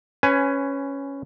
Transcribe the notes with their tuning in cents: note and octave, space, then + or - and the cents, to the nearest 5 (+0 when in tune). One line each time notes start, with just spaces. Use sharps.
C#4 +0 B4 +20 G#5 +10